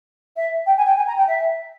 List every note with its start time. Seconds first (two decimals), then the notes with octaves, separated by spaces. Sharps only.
0.36 E5
0.66 G5
0.77 G#5
0.86 G5
0.96 G#5
1.07 A#5
1.17 G5
1.28 E5